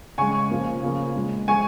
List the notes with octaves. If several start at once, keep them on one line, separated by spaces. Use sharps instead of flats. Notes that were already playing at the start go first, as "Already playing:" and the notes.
C#3 G#3 G#5 C#6
C#3 F3 A#3
C#3 F3 A#3
A#2 G#3
F3 G#3 G#5 C#6